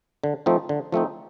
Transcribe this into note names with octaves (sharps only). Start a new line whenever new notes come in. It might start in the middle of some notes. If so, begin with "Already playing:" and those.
D3
F3 A3 C4 D#4
D3
F3 A3 C4 D#4